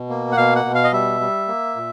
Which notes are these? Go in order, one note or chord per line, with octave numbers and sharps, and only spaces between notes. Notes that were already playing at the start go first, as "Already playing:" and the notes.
Already playing: B2
A#3
F#5
B2 F5
F#5
B2
F5
D#5
G3 E5
G3
A#3
A#2